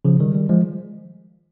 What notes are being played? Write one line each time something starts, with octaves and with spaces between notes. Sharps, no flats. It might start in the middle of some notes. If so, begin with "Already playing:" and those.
C#3 F3
D#3 G3
D#3 G3
F3 G#3